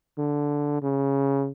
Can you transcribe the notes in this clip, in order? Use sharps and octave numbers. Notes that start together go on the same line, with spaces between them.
D3
C#3